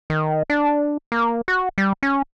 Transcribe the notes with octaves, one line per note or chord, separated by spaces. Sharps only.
D#3
D4
A#3
F#4
G3
C#4